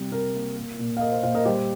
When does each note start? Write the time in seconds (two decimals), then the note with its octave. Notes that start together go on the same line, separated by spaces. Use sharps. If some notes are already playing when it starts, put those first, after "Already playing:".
Already playing: C3 G3
0.12 C3 A#4
0.34 A#3
0.56 A#3
0.79 A#2
0.97 F5
1.01 A#3 A#4 D#5
1.12 C5 F5
1.23 A#2 C5 F5
1.35 A#4 D#5
1.45 G3 G4 C5